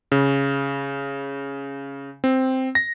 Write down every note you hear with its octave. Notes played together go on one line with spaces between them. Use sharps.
C#3
C4
A#6